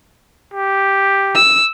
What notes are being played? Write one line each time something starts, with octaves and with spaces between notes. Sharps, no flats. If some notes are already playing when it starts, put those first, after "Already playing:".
G4
E6